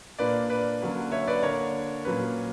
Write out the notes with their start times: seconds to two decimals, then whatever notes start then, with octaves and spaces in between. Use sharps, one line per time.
0.18 A#2 A#3 D4 B4 D5
0.50 B4 D5
0.82 D3 F#3 A#3 C#4
1.11 C#5 E5
1.27 B4 D5
1.43 D3 A#3 D4 A#4 C#5
2.05 A#2 F#3 A#3 C#4 B4